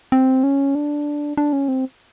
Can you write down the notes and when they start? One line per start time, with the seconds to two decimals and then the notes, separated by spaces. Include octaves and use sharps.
0.12 C4
0.43 C#4
0.75 D4
1.37 D4
1.53 C#4
1.68 C4